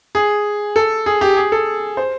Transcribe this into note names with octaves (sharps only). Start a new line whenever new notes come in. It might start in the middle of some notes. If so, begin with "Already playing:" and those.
G#4
A4
G#4
G4
G#4
A4
C5